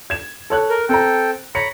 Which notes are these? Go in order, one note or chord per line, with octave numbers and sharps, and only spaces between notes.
G#6 E7
A4 C#5 F#6
A#4
C4 A4 G5 A#5
C#5 A#5 B5 C#7